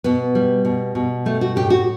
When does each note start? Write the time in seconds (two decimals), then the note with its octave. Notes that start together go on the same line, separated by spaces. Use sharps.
0.04 B2 B3
0.35 G3
0.65 B2
0.95 B2
1.25 G3 A3
1.41 F#4
1.56 A2 G4
1.70 F#4